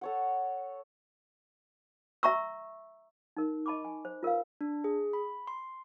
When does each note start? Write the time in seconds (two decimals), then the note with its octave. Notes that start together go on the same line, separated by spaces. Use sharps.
0.01 A4 C#5 F#5
2.23 E5 A#5 C#6 E6
3.37 D#4 A#4
3.66 D#5 A5 B5 C#6 D6
3.85 G#5
4.05 C5
4.23 F4 A#4 B4 F5
4.61 D4
4.84 G#4
5.13 B5
5.47 C6